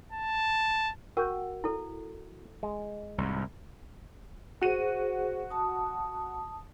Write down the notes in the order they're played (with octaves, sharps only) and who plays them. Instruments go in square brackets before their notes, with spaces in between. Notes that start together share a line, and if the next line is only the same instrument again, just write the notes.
[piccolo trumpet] A5
[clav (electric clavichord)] F#4 G5 [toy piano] A#4
[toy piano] E4 A4
[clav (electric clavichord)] G#3
[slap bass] C2 G#2
[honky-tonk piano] F#4 D#7 [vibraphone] G#4 C5
[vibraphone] A5 D#6